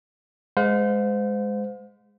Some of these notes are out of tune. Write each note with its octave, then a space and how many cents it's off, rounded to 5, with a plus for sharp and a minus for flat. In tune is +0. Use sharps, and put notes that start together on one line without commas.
G#3 +0 C5 -30 F5 +40